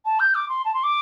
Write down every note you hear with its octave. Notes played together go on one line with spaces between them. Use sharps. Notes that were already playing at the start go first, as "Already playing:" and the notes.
A5
G6
D6
C6
A5
C6
D6